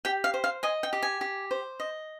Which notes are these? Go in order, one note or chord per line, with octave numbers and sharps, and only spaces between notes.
G4 G5
F5
C5
F5
D#5 G#5
G5
G4
G#5
G4
C5
D#5